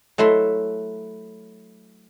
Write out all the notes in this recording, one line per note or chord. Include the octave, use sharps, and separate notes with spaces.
F#3 A3 E4 E5 C6